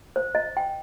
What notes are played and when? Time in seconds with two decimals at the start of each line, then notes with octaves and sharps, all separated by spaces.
0.16 C5
0.35 D#5
0.57 G5